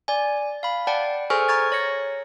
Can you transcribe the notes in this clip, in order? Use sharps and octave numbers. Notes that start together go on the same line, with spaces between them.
D5 G#5
F5 B5
D5 F#5 G5 A5
G#4 A4 C5 G#5 C#6 F6
A#5 C#6 G#6 A6
C#5 A#6 C#7